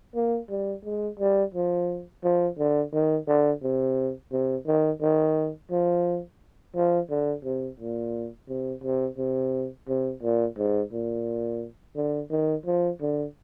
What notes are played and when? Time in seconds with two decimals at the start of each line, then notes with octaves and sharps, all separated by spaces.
0.15 A#3
0.50 G3
0.85 G#3
1.20 G3
1.54 F3
2.24 F3
2.58 D3
2.94 D#3
3.28 D3
3.63 C3
4.32 C3
4.67 D#3
5.02 D#3
5.71 F3
6.75 F3
7.10 D3
7.44 C3
7.80 A#2
8.49 C3
8.83 C3
9.18 C3
9.88 C3
10.23 A#2
10.58 G#2
10.93 A#2
11.96 D3
12.31 D#3
12.66 F3
13.01 D3